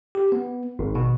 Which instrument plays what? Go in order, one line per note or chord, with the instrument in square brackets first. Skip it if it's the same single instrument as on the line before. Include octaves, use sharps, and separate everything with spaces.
[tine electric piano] G4
B3
G#1
B2